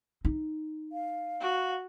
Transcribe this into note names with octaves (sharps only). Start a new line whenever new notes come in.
D#4
F5
F#4